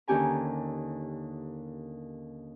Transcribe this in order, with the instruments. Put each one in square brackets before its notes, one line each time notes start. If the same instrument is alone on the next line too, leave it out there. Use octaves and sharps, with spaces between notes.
[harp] D#2 D3 C#4 G4 G#5 A#5